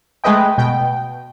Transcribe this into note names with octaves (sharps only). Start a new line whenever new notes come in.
G#3 A3 G#4 B4 D#5 G5
B2 G5